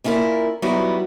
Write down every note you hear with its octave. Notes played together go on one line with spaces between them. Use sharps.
A#3 C#4 E4 F4 A#4 D5
F#3 G3 B3 D#4 E4 F#4